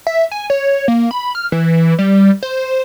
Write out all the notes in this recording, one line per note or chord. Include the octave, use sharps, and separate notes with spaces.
E5
G#5
C#5
A#3
B5
F6
E3
G3
C5